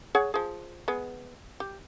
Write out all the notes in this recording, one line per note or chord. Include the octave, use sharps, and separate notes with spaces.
G#4 C#5 F#5
F3 G#4
G#3 B3
G4